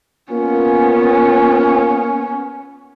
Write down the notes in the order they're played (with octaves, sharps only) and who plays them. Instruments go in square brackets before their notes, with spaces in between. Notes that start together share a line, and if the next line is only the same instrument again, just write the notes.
[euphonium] A#3 [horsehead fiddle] B3 C#4 [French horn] F4